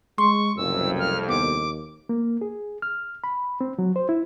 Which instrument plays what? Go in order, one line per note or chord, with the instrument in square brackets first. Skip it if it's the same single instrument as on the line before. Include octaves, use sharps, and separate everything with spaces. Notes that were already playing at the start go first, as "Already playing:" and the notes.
[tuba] G#3 [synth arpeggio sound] C6 [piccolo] C#6
[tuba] F#1 [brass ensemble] C2 F2 [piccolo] E6
[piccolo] F6
[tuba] D#2 [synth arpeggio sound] B3 [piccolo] D6
[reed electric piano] A#3
G#4
F6
B5
C4
F#3
C5
E4